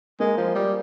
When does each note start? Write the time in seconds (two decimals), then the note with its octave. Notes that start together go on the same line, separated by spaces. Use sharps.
0.20 G#3 A#3
0.37 F3
0.55 G3